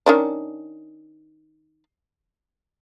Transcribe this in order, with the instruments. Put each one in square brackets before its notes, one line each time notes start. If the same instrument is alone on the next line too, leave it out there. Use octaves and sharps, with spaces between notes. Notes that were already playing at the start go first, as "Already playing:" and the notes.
[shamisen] D#3 C#4 D4